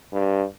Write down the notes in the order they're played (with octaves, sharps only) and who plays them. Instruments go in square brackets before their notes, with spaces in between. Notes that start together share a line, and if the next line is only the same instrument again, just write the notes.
[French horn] G2